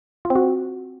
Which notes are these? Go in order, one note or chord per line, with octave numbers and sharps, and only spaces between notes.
F4
C4
F#4